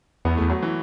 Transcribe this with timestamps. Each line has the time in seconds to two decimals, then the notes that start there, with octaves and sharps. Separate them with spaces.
0.25 E2 B3
0.37 A3
0.41 E2
0.50 F#3
0.62 E3